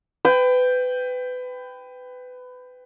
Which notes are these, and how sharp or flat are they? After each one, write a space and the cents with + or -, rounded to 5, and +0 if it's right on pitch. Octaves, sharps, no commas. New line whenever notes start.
B4 +25 G5 +5